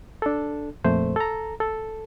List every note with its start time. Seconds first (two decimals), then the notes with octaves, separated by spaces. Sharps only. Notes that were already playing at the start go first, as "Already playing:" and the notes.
0.22 D4 A4
0.84 F2 A#2 A3 C5
1.16 A4 A#5
1.60 A4